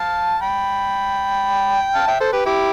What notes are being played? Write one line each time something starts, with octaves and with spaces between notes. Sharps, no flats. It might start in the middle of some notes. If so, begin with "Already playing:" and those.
Already playing: F5 A5
G5 B5
F5 A5
E5 G5
A4 C5
G4 B4
E4 G4